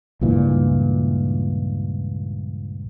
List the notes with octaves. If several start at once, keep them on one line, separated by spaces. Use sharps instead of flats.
C#2 G2 A#2 E3